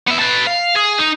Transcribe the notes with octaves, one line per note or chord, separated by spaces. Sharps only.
B3 E5
B4 A5
F5
G#4
D#4